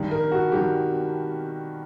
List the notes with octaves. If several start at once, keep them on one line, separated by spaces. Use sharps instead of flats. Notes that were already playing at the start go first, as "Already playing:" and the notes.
Already playing: G2 D#3
A#4
F#4
G2 D#3 G4